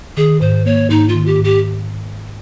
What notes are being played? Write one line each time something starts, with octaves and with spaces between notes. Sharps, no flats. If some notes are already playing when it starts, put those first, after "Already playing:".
D#3 G#4
G#2 C5
A#3 C#5
G#2 D#4
F4
D#3
G4
G#2
G4